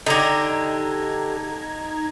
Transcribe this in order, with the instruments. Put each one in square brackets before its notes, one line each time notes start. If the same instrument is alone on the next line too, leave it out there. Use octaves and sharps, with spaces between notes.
[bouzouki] D3 G4 [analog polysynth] D#4 A#5 G#6